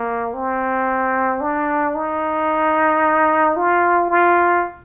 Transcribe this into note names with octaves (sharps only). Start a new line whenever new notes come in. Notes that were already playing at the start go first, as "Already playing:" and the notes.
Already playing: A#3
C4
D4
D#4
F4
F4